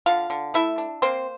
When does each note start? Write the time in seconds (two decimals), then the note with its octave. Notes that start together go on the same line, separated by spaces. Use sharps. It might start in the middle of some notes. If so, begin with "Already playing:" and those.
0.06 D3 F4 F5
0.30 D3
0.54 A3 E4 E5
0.78 D4
1.02 A#3 C4 C5